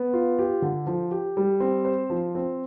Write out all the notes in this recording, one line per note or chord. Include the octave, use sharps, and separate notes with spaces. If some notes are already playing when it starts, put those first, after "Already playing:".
Already playing: B3
F4
G4
D3
F3
G4
G3
C4
C5
F3
C4